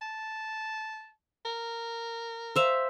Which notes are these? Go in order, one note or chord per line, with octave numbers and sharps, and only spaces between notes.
A5
A#4
C5 E5 F5